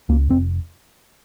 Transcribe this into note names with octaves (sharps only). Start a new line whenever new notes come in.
C#2 A#3
F1 C4